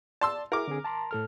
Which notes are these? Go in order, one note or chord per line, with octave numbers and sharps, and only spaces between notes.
D5 A5 C6 E6
E4 G#4 A#4 D6
D3 C4 G#4
A5 A#5 C6
A2 A4 F6